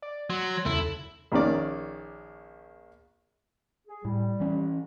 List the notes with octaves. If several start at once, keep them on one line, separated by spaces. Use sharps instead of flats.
D5
F#3 C6
E2 C#3 E4 A4
A#1 D#3 C#4 D5
G#4
A2 G3
E3 C#4